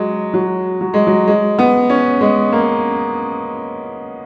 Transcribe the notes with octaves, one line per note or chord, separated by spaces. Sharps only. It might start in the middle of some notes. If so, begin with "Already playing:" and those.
Already playing: F#3 G#3
F#3
F#3
G#3
F#3
G#3
B3
C#4
G#3
A#3